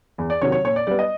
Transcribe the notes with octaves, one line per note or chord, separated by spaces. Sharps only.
E2
D5
C3 D#3 F#3 C#5
C#5
A#2 C#5
D5
G3 B3 D5
D#5